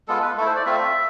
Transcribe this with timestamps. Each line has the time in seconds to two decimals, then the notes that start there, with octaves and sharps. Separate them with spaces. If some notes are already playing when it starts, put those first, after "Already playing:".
0.08 G#3 B3 F4 A4
0.22 B4
0.37 A3 A4
0.41 E4
0.46 C5
0.56 D5
0.66 A3 C4 F4 E5